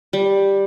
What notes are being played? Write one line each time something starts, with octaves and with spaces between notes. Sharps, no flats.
G3